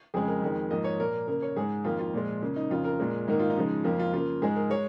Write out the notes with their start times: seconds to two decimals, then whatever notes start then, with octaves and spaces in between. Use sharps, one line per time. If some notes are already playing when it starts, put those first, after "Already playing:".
0.14 F2 C#3 G#3 G#4
0.28 A#4
0.42 F2 D#3 G#3
0.70 G#2 F3 A#3 D#5
0.84 C#5
1.00 A#2 A#3 A#4
1.27 C#3 A#3 A#4
1.42 C#5
1.56 G#2 G#3 G#4
1.84 F2 D#3 A#3 F4
1.99 F4
2.14 A#2 F3 G#3
2.42 C#3 A#3
2.56 D#4
2.70 F2 C#3 A#3 F4
2.84 A#4
3.00 A#2 G#3
3.28 G#2 D#3 A#3 D#4
3.40 F4
3.50 D#4
3.56 C#3 F3 G#3
3.84 F2 F3 A#3 F4
3.99 F4
4.13 C#3 A#3 F4
4.42 G#2 G#3 G#4
4.56 A#4
4.70 G#3 C#5